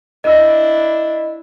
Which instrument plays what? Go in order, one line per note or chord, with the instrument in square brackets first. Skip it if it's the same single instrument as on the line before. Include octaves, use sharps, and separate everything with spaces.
[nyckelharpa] D4 E4 [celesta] D#5 E6